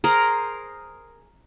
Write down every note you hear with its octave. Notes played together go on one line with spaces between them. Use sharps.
G#4 A#4 C5